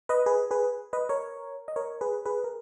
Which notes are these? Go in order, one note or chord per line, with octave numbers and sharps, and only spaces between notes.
B4 D#5
G#4 B4
G#4 B4
B4 D#5
A#4 C#5
D#5
A#4 C#5
G#4 B4
G#4 B4
A#4